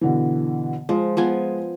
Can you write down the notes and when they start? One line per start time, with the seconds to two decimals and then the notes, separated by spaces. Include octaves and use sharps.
0.01 B2 D3 E3
0.89 F3 G#3
1.17 F3 B3 G#5